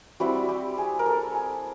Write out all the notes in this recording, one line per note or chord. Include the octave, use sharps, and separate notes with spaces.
G3 C4 E4 F#4
G4
G#4
A#4
A4
G#4